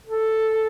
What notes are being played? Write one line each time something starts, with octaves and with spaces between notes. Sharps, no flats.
A4